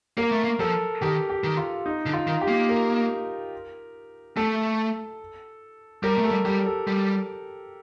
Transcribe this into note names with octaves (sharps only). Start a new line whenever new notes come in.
A#3 A#4
A3
A#3
F3 A4
D#3 G4
G4
D#3
F4
D#4
D3
F4
D#3
G4
A#3
A#4
A3 A4
G3 A#4
A3
A4
G3
G3 G4
A4
G3